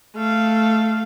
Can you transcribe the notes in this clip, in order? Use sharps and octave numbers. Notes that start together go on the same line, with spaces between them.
A3 F5